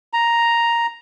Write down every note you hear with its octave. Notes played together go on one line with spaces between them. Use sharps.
A#5